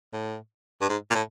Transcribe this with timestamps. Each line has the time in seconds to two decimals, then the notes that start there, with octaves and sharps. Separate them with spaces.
0.13 A2
0.81 G2
0.89 G#2
1.10 A#2
1.14 A2